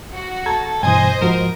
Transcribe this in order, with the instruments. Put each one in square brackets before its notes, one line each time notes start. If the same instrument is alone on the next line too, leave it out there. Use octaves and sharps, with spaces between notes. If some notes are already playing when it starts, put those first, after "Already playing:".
[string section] F#4
[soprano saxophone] A4 [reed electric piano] A5 A#5 G#6
[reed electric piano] G2 B2 E3 [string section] C5 D#5 [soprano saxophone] G#5
[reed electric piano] G#2 F3 F#4 [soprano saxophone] A#4